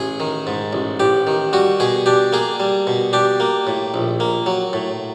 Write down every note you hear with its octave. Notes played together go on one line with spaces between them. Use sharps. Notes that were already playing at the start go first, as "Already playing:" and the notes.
Already playing: A1 G#4
D#3
G#2
A1
A1 G4
D#3
G3 F#4
B2 G#4
D4 G4
A#3 G#4
G3
B2
D4 G4
A#3
A2
A#1
A#3
F#3
A2